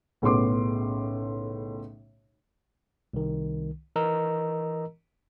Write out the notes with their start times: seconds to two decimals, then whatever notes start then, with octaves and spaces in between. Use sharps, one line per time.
0.22 B1 A2 C#3 B3 C6 D6
3.14 C2 D#3
3.96 E3 A#4 D#5 A#5 E6